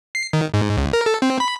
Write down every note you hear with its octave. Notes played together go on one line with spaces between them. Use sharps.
C7
D#3
G#2
C#2
A#4
A4
C4
B5